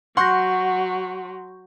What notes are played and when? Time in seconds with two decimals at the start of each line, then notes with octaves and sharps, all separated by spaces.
0.17 F#3 F#5 C6 C#6 F#6 G6 A#6